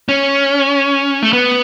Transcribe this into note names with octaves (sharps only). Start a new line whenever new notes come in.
C#4
A3
B3